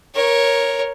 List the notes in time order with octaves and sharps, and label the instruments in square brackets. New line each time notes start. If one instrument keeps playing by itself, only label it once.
[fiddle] A#4 C#5